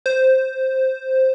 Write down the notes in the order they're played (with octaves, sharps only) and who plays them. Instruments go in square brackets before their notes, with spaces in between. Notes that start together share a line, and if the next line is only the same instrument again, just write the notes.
[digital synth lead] C5